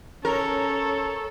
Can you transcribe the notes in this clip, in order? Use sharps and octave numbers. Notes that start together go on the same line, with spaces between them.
C#4 A4 A#4 C#5